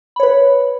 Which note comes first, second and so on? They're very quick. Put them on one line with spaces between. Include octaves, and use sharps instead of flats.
B5 C#5 B4